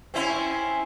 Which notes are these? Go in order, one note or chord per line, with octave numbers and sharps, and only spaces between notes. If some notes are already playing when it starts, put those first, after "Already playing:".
C4 C#4 E4